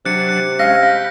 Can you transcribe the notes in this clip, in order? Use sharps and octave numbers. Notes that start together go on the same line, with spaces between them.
C3 F#3 D4 F#6 C#7
F#6
G#3 C#4 F5 A#6
G5 B5